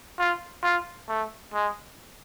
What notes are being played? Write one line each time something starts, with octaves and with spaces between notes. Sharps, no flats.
F4
F4
A3
G#3